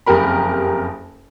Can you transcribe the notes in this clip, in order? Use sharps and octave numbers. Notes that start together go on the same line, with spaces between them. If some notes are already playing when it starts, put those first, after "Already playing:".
F#1 F2 G4 A#4 B5